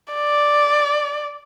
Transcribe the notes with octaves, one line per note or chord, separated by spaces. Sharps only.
D5